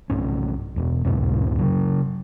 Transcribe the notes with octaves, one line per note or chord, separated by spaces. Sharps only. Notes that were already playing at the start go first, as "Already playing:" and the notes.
B1 G2 C#4
E1 E2
C#2 F#2 A2 C3
C#3 F#3